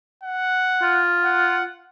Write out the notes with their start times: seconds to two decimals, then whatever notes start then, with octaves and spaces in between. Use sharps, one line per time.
0.23 F#5
0.82 F4
1.25 F#5